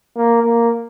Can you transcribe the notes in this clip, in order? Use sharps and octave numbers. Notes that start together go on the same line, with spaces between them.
A#3
A#3